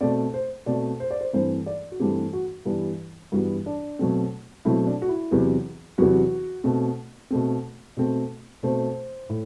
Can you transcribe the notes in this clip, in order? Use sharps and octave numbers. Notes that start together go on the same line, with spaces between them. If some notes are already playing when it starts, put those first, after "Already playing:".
B2 A3 C4 D5
C5
B2 A3 C4 D5
C5
D5
C5
G2 E3 A3 C4 C5
D5
F#4
G2 E3 A3 C4 G4
F#4
G2 E3 G3 B3 D4
G2 E3 G3 B3 F#4
D4
B2 F#3 A3 C4
B2 F#3 A3 C4 E4
D4
F#4
E4
E2 C3 F#3 B3
E2 C3 F#3 B3 F#4
B2 A3 C4
B2 A3 C4
B2 A3 C4
B2 A3 C4 C5
A2